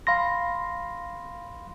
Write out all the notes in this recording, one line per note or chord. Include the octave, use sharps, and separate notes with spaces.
F5 B5 C6 A#6